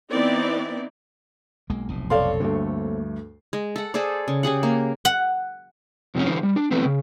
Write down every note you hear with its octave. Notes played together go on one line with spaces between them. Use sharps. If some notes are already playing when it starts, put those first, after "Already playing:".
E3 B3 C4 D#4 E4 D5
B1 G#3 A#3
F1 B1 A2
C4 A4 C#5 D5 F5 C6
D2 G2 A3 A#3
G#3
A4 F#5
G#4 A4 C5 D5
C#3
C#3 G4 G#4 F#5
A#3
F#5
F2 C3 F3 G#3 A3 C#4
D3 E3 D#4 C5
G3
D4
E3 A3 B3 C4
C#3